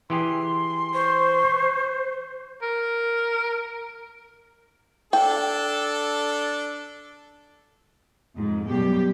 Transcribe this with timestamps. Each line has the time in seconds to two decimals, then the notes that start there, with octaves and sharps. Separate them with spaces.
0.10 E3 G4 G#4 C6
0.94 C5 C#6
2.62 A#4
5.13 D4 A4 G5
8.36 F2 G#2
8.67 F#2 B2 G3 G4